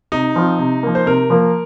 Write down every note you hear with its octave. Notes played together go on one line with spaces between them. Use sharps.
C3 D#4
F3 C4 F4
C3
F3 A#3
C5
C3 A#4
F3 A#3